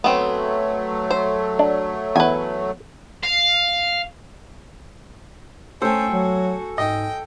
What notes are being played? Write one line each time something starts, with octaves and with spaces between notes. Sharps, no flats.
F#3 A3 B3 C4
C5
D4
E2 B4 G#5
F5
A3 C#4 A4 C5 G5 G#5
F#3 F#4
G#2 D#5 G5